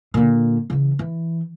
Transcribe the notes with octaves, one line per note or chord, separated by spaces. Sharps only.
A#2 D3
C#3 E3
E3